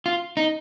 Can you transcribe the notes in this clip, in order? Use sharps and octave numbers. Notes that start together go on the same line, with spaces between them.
F4
D#4